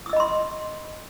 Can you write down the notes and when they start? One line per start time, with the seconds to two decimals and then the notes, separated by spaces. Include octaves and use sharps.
0.06 D#6
0.10 E6
0.13 D#5
0.16 B5
0.20 C6